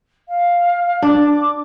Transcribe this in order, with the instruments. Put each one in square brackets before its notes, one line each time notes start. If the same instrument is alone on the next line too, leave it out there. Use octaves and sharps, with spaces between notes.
[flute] F5
[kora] D4 [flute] D6